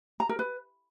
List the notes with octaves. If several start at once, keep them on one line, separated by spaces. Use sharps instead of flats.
A#5
A#4
B4